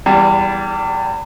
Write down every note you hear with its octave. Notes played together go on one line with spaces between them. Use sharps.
E2 G3